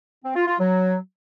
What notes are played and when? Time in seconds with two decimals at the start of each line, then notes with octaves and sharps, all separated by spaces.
0.24 C4
0.36 F4
0.48 F4
0.59 F#3